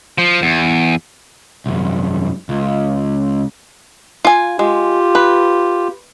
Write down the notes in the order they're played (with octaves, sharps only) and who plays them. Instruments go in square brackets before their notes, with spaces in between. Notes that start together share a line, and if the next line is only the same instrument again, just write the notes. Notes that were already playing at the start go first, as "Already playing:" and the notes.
[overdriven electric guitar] F3
E2
C2 F#2
C#2
[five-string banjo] F4 G#5
[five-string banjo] G#3 [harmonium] F4 G4
[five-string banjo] B4